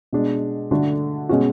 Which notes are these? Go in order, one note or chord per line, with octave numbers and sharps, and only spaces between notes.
B2 G#3 D4
D3 A3 D4 F#4
B2 G#3 C#4 F#4